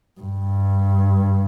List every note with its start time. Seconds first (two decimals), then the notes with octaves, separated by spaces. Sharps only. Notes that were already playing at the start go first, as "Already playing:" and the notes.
0.21 G2